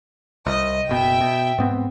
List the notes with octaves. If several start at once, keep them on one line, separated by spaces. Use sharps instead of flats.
C2 D#5
F#1 B2 E5 G5
B2
G#2 B3 C4